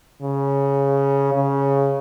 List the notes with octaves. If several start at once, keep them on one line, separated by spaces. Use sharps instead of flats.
C#3
C#3